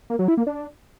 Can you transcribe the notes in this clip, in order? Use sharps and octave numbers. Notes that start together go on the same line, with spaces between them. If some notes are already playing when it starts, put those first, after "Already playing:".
A#3
F#3
E4
A#3
D4